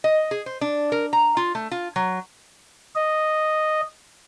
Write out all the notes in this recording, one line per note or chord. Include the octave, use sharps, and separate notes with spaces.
D#5
G#4
C5
D4
A#4
A#5
F4
A3
F4
F#3
D#5